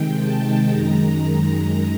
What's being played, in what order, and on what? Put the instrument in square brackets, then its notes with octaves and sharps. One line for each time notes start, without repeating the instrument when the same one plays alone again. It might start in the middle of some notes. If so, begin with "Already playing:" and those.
Already playing: [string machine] C3 D#3 G#3 G5
A5
F#2 D#3 G#3 A#5
A#5